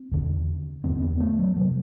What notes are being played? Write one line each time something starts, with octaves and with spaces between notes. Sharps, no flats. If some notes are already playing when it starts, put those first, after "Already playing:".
Already playing: C4
E2 D3
E2 D3 C4
B3
A3
F#3
C3 F#3